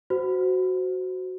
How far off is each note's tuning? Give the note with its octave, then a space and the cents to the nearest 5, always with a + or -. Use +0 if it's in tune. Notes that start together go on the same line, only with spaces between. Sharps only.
F#4 +0 C5 -20